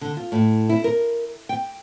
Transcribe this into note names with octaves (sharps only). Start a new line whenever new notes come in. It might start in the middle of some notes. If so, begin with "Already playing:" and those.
D3
F4
A2
E4
A#4
G5